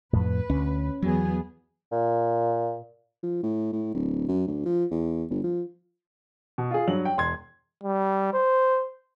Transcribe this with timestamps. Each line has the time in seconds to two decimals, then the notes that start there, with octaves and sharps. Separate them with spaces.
0.13 F2 A2 B4
0.50 D2 C#4
1.02 E2 F#3 B3 G#4
1.92 A#2
3.23 F3
3.43 A2
3.73 A2
3.94 D1
4.28 F#2
4.48 D2
4.66 F3
4.91 E2
5.30 G1
5.44 F3
6.58 B2
6.71 F4 G#4
6.87 G2 F#3 F#7
7.05 G5
7.17 E1 C6 G#6
7.83 G3
8.34 C5